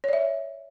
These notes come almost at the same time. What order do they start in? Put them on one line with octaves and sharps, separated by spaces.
C#5 D5 E5